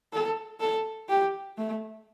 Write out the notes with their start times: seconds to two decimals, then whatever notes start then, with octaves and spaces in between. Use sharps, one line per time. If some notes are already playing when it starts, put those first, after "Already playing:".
0.13 A4
0.60 A4
1.09 G4
1.58 A3